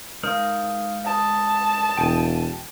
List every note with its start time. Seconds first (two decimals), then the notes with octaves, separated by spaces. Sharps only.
0.23 G#3 D#4 A#4 C5 F5
1.05 A5 D#6
1.97 E1 G5 G#5